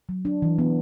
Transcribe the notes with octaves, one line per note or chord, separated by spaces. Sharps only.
F#3
D4
E3
B3